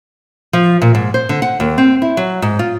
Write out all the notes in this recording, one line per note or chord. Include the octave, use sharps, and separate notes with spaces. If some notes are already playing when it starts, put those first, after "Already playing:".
F3
A#2
G#2
C5
D3
F#5
D#2
C4
E4
F#3
G#2
F4